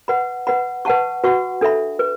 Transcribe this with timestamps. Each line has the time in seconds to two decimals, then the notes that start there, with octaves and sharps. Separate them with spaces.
0.08 B4 F#5 B5
0.47 B4 F#5 B5
0.85 B4 F#5 A5 C#6
1.24 F#4 B4 F#5 C#6
1.61 D4 A4 E5 B5
1.99 B4